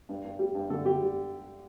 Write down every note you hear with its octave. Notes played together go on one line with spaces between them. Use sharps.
G2
G2
G3
G2
D3 A4
D3 G4
G3